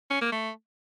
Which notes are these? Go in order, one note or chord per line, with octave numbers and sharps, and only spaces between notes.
C#4
A#3
A3